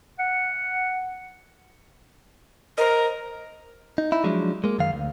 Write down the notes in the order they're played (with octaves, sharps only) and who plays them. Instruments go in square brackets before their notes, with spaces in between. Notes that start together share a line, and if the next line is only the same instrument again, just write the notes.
[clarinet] F#5
[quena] A#4 [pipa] C5 D#5
[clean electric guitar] D#4
D#4 E4
F3 F#3 G#3 D4
G#3 A#3
F#2 D#3 F5
D2